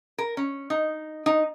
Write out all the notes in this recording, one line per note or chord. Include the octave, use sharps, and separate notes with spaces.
A#4
C#4
D#4
D#4